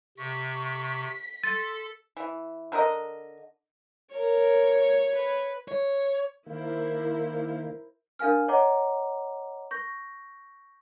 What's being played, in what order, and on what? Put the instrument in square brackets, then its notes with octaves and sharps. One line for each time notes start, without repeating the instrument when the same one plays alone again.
[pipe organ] C3 [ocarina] C#6 [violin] B6
[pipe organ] A4 [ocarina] C6 [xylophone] A6
[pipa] E3
D3 A#4 B4 D#5
[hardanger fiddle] A#4 [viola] C#5
[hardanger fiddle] B4
[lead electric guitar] C#5
[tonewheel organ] D#3 A#3 [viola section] E4 A#4 C5
[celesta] D4 A#4 F5 G#5 F6
C#5 D#5 F#5 A#5 D6
C#6 G6 A#6